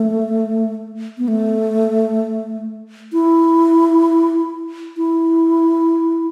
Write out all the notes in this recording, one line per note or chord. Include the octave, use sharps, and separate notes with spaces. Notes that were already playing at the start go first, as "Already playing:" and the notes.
Already playing: A3
B3
A3
E4
E4